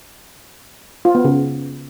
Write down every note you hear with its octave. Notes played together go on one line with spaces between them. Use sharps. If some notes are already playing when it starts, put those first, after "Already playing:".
F4
B3
C#3